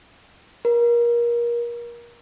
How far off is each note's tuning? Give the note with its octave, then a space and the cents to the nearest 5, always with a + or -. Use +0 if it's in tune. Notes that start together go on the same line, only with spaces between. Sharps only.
A#4 +25